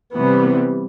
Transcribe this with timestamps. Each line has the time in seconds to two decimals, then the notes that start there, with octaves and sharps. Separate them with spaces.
0.15 C3 E3 G3 B3